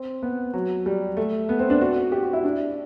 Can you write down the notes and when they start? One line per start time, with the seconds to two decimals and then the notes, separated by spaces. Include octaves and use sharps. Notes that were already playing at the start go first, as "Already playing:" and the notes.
Already playing: C4
0.23 B3
0.54 F#3
0.86 G3
1.17 A3
1.49 B3
1.59 C4
1.70 D4
1.81 F#4
2.12 G4
2.23 F#4
2.33 E4
2.44 D4